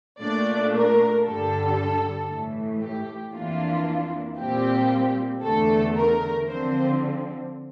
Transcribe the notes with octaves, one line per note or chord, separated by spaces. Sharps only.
A#2 A3 D4 D5
A#4
G2 D3 G3 A4
A2 E3 A3
G4
F2 E3 A#3 D4 F4
A#2 G3 C4 G4
E2 D3 A3 A4
A#4
D3 F3 C4 C5